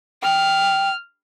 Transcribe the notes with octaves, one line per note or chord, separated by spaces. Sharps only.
G5 F6